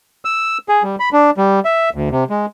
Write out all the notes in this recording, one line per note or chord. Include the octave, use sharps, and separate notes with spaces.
E6
G#4
G3
B5
D4
G3
E5
D2
C3
G#3